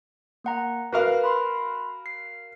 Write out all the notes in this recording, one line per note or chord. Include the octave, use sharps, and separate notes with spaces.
A#3 F#5 A#5
F#4 A#4 B4 F5
B5 C6
C7